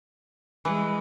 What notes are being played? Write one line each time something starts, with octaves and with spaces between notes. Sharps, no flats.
E3 G#3